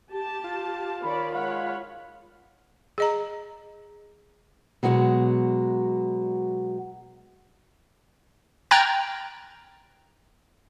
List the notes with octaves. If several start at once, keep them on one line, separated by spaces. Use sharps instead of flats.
G4 A5
F4
D#3 C#5 D5 B5
G#3 C#5 F5 F#5 B5
G#4 D#5 A#5
B2 F#3 G#3 F#4
G5 A#5 F6 F#6 G#6 A6